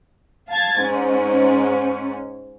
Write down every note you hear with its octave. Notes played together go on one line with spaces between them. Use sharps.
F5 A5 G#6 A6
G#2 C#4